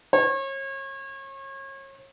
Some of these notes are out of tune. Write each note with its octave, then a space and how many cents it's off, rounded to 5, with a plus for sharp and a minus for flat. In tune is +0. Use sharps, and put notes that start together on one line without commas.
C#5 -35